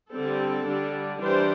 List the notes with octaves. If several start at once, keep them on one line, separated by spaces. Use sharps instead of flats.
D3 G3 C4 A4
D3 G3 D4
E3 G3 D4 C5